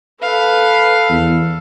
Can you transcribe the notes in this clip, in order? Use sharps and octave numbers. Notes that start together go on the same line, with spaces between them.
A4 B4 F5
E2